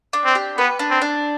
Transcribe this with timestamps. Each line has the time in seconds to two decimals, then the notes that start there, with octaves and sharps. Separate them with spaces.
0.13 D4
0.25 C4
0.35 G4
0.57 B3 B4
0.79 D4
0.91 C4
1.02 D4